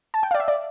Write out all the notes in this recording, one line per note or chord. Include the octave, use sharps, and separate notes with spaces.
A5
G5
F5
D5
E5
D5